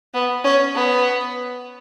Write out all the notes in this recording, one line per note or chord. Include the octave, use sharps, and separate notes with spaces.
B3
C#4
B3